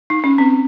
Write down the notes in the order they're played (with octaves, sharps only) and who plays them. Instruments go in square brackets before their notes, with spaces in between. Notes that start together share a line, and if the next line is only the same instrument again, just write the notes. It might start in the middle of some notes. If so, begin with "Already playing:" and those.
[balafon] D#4
C#4
C4